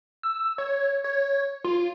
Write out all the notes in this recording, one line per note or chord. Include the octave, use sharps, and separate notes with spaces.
E6
C#5
C#5
F4